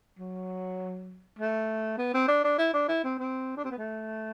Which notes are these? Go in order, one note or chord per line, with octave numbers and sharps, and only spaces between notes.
F#3
A3
B3
C4
D4
D4
E4
D4
E4
C4
C4
D4
C4
B3
A3